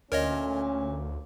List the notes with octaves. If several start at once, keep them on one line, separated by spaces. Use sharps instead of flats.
D2 A#2 A3 C#4 A#4 C#5 D#5